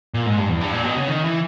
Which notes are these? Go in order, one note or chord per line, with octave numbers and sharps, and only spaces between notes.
A#2
G#2
G2
E2
G2
A#2
B2
C#3
D#3
E3